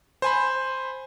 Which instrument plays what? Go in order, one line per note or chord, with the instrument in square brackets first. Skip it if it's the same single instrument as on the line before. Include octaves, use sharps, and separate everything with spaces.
[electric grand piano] C5 G#5 B5